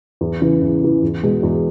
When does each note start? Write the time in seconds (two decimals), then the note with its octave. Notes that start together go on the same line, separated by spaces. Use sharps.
0.21 E2
0.41 C#3 E3
0.62 E2
0.81 C#3 E3
1.02 E2
1.23 B2 G#3
1.43 E2